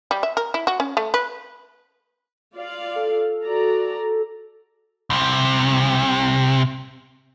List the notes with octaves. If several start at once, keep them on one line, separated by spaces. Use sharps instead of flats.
G3
E5
A#4
E4
F#4
C#4
A3
B4
F4 D5 F5
A4
F#4 D5 A#5
C2 C3